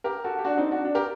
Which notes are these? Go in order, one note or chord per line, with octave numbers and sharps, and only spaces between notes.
G4 A#4
F#4 A4
G4
D4 F#4
C4 D#4
D4 F#4
D4 F#4
G4 A#4